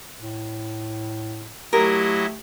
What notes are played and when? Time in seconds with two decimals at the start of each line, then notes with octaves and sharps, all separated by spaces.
0.20 A2
1.73 F#3 A3 E4 G4 A#4 D#5